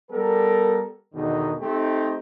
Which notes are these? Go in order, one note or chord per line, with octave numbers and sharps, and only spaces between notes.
G3 B3 A4 A#4
E2 B2 D3 D#3 D#4
A3 C4 D#4 G4